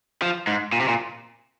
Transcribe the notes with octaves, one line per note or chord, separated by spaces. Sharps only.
F3
G#2
A#2
C3
A#2